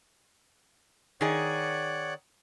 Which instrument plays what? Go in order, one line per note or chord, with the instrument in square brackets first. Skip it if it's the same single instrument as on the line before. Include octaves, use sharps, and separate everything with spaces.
[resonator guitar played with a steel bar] D#3 G#4 [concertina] C#5 D5 F#5